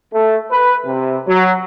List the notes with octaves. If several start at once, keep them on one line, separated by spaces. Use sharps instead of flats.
A3
B4
C3
F#3